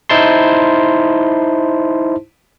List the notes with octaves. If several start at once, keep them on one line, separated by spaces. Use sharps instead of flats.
D#4 E4 C5 A5 C6